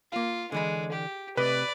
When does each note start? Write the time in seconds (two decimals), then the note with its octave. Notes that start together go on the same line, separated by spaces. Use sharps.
0.12 A#3 F4 F5
0.52 D3 E3 G#3 B5
0.92 G4
1.37 C3 A3 B4 D5 D#5